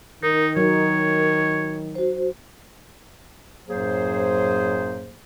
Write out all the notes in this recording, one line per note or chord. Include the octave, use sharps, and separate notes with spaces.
D#3 D#4 A#4
F#3 D#4 C#5
F#4 C5
F#2 A2 F#3 A#3 G#4 C5